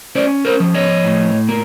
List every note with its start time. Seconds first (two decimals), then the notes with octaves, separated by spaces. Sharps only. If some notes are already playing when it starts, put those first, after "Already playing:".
0.15 C#4 C5 D5
0.45 A#4 C5
0.60 F3
0.74 C#5 D#5
1.04 A2
1.49 A#3